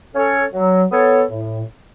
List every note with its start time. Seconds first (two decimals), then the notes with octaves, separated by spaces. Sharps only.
0.14 C#4 A4 C#5
0.53 F#3
0.91 B3 A4 C#5
1.30 A2